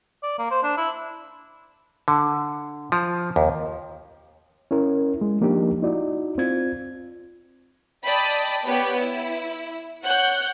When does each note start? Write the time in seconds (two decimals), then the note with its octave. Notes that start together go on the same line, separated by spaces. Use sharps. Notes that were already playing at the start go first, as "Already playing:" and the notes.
0.23 D5
0.39 A#3
0.51 C5
0.63 D4
0.77 E4
2.08 D3
2.92 F3
3.36 D#2
4.71 C#4 E4 A#4
5.21 G#3
5.41 F3 A#3 D4 D#4 G4
5.82 D#4 E4 F#4 D5
6.38 C4 F4 G#6
8.05 D5 D#5 G5 A5 B5 D#6
8.64 B3 G4 B4 C#5
8.97 E4
10.04 C#5 F#5 F#6 G6